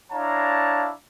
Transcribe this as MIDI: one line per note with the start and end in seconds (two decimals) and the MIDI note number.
0.12 0.91 62
0.12 0.91 64
0.12 0.91 73
0.12 0.91 77
0.12 0.91 81
0.12 0.91 82